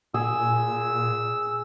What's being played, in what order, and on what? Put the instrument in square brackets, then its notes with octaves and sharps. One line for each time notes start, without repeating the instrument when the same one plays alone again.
[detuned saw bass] A#2 [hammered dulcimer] G#4 [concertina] E6